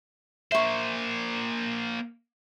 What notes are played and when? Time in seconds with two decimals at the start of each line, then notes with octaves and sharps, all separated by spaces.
0.52 A#3 C5 E5 C#6